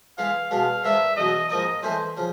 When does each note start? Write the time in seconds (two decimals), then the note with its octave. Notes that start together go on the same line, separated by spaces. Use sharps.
0.18 E3 G#3 B3 E4 F5
0.51 B2 G#3 B3 D4 F5
0.84 G#2 D#3 G#3 B3 D4 E5
1.16 E2 B2 F#3 D#5
1.49 G#2 F3 A#3 D#4 D#5
1.83 E3 A3 C#4 E4 C5
2.17 C#3 F3